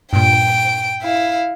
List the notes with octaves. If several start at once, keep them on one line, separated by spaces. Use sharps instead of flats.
G2 A#2 G5 D7
E4 F5